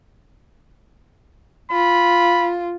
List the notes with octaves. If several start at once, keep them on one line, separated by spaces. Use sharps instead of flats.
F4 B5